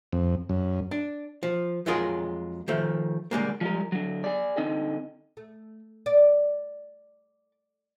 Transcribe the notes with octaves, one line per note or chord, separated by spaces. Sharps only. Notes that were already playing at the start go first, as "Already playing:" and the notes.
F2
F#2
D4
F3
F2 F#3 G#3 F4 G#4 A#4
D#3 F3 A3
D3 G3 G#3 A#3
F3 G3 G#3 A#4
D3 F#3
G#4 D5
D3 C4 D#4 D#5 G5
A3
D5